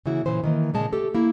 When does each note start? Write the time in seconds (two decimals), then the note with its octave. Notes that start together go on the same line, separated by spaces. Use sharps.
0.06 C#3 E3 A#3 E4 F#4
0.26 A#2 C#3 E3 C5
0.44 D#3 E3 A#3
0.74 A#2 C#3 G#3 A5
0.93 A3 G4 A4
1.14 A#3 E4